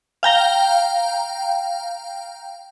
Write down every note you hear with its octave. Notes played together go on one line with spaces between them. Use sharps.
F5 G5 A#5